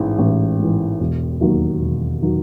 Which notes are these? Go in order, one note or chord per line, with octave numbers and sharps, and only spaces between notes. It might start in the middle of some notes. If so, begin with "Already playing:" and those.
Already playing: A1 G#2 E3
A1
G#2 E3
E1
D#2 D#3 F#3
E1
D#3 F#3